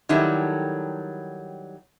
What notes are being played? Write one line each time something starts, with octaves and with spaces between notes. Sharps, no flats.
D#3 F#3 G3 E4 A4